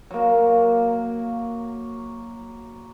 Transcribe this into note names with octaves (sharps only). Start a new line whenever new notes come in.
F#3 A#3